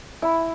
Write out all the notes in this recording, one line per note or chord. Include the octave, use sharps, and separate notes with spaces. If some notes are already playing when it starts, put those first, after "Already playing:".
E4